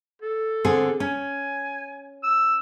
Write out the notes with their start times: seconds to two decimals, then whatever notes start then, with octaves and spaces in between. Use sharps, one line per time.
0.22 A4
0.65 D3 C4 G#4
1.00 C#4 G#5
2.23 E6